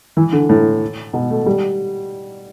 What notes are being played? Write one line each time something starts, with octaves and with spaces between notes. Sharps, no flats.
E3
D3
A2
B2
A3
G3